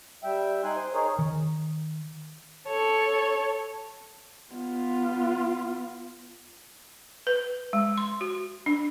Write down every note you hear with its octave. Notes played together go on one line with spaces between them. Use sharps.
G3 E5 G5
D#4 G#5 C6 F#6
C5
D#4 G#4 A#4 C#5
D#3
A4 C#5
B3 F4
B4
G#3
C6
F#4
D4